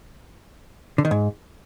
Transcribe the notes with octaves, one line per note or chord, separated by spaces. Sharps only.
D3
D#3
G#2